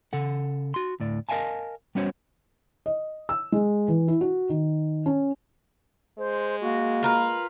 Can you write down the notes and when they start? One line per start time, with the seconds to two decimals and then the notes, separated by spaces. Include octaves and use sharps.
0.13 C#3 A4 F#5
0.74 F#4 C6
1.00 D2 A2 D5
1.29 A#4 D#5 F5 G#5 A5
1.95 G3 B3 C#4 F#4 C5 C#5
2.86 D#5
3.29 E6
3.52 G#3
3.88 E3
4.08 E4
4.21 F#4
4.49 D#3
5.06 C#4
6.18 G#3 C5
6.61 A#3 F#4
7.03 F4 A#4 B4